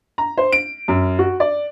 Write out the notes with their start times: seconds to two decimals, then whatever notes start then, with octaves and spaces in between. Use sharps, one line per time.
0.18 A#5
0.38 C5
0.52 D7
0.88 F#2
1.19 F#4
1.40 D5